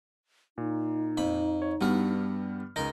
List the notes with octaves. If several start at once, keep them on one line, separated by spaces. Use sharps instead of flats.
A#2 D#4
F2 B5
C#5
G2 G3 B3 F#4 F6
C#2 D#4 A#4 A#6